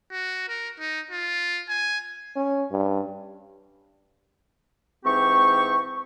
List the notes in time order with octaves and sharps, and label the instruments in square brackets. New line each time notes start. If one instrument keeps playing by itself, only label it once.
[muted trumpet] F#4
A#4
D#4
F4
G#5
[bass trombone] C#4
G2
[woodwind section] G#2 E3 C4 G4 C#6